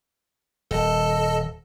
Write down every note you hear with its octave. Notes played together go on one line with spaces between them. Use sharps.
D#1 A4 D#5 A5